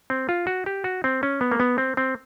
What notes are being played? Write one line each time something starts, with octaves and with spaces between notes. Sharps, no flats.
C4
F4
F#4
G4
F#4
C4
C#4
B3
A#3
B3
C4
C4